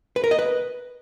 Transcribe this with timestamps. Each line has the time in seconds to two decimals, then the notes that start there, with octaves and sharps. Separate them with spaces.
0.16 B4
0.24 A#4
0.31 D#5
0.39 B4